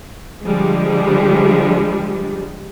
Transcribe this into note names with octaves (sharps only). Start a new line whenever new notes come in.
D3 F3 G3 G#3